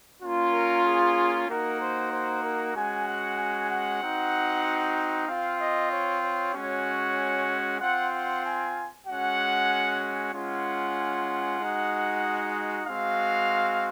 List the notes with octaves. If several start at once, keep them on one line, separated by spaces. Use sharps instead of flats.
A#3 C#4 F4
A#4
G#4
A#3 D#4 F#4 A#4
C5
C5
A#4
G#3 C#4 F#4 G#5
F#5
G#5
F#5
C4 D#4 F#4
C4 F4 F5
D#5
C#5
C#5
G#3 C#4 F#4
C4 F4 F#5
F#5
G#5
G#3 C#4 F#4 F#5
G#3 C#4 F4 F#5
G#3 D#4 F#4
G#3 C4 F#4 F5